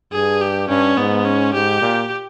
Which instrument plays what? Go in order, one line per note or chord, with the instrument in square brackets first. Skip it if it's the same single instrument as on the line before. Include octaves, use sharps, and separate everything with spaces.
[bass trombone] G2 [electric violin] G#4
[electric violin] G4
[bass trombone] G2 [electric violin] C#4
[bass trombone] G#2 [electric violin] B3
[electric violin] C#4
[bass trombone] G#2 [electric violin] G4
[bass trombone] A#2